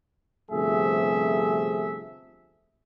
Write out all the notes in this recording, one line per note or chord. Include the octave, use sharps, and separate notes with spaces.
G1 C3 F3 A3 G#4 E5